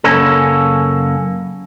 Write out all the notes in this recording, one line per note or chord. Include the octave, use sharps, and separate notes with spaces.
F#2 C#3 A#3 C#4 A4